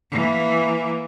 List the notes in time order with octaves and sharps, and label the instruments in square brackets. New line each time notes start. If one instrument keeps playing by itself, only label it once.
[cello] E3 A#3